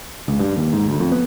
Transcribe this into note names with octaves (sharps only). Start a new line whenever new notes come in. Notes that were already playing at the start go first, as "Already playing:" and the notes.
C#2
G2
D#2
G#2
D2
F2
B3